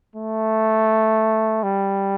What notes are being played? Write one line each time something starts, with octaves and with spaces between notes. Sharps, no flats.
A3
G3